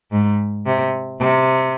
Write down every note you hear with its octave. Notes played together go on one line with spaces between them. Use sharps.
G#2
C3
C3